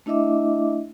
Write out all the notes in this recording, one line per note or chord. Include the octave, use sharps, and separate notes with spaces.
A3 D4 E4 D#5 E5 D6